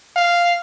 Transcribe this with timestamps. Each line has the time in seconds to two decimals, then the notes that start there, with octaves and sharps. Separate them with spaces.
0.16 F5